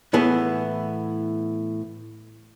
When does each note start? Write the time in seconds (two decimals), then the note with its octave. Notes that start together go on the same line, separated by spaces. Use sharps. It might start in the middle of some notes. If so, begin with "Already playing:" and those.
0.13 A2 E3 B3 G#4